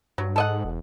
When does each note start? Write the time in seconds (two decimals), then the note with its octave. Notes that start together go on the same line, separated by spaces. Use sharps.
0.18 G2 F#3
0.36 G#2 A4 D#5 F#5
0.65 E1